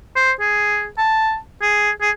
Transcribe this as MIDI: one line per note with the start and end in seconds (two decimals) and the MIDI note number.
0.16 0.32 72
0.40 0.86 68
0.98 1.36 81
1.62 1.91 68
2.02 2.11 68